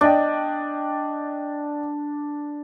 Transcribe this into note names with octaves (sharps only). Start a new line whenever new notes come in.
D4 D5 D#5 G5